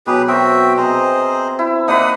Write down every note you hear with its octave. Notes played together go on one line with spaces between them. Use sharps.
B2 F#3 G4 G#4 B4
C4 F#4 A#4 E5 G5
C3 G#4 C5 D#5 A#5
E4
A#3 D#4 B4 D5 F5 F#5 D#6